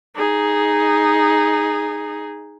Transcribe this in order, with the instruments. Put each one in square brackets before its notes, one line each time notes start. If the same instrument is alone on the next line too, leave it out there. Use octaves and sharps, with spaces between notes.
[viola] D#4 G#4